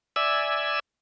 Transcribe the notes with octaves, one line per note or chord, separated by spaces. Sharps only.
D5 E5 G#5 E6